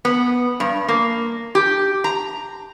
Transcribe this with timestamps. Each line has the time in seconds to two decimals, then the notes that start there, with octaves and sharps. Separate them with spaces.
0.05 B3
0.60 G2
0.88 A#3
1.55 G4
2.04 A#5